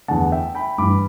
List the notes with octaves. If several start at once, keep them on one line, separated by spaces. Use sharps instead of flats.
E2 D3 F#5 A5
E5 G5
G5 B5
G2 E3 B5 D6